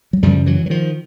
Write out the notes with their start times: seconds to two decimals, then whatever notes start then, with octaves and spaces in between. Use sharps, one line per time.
0.13 F#3
0.23 F#2 C#3 F3 G3
0.46 E3 F#3
0.66 F#3
0.70 D#3 F3